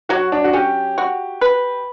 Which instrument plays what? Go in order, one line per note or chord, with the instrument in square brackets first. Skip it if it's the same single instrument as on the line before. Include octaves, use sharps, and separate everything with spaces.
[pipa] F#3 [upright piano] F#4
[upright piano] D4
F#4
[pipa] C#4 [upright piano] G4
[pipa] F#4
B4